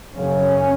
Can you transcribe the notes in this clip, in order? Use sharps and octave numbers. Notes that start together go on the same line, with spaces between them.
F#1 F#2 C#3 C#4